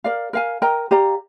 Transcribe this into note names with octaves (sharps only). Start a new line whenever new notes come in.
A#4 D5 F5
A#4 F5 G#5
A#4 D#5 G5 A#5
G4 D5 F5 A#5